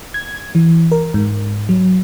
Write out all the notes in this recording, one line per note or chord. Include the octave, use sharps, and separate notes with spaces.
G#6
E3
A#4
G#2
F#3